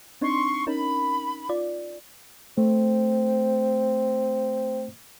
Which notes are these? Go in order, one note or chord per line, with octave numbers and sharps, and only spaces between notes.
C4 D4 D#4 C6 C#6
C#4 D#4 A#4 B5
F4 D5
A3 C4